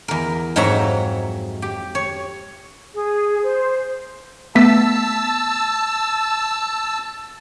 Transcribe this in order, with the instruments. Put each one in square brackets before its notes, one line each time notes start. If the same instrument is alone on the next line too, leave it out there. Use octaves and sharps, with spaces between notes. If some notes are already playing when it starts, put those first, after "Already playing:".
[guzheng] E2 A#4
F2 G#2 F#3 C#5 E5 A#5
G4
C#5
[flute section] G#4
C5
[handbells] A3 B3 B6 [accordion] A5 E6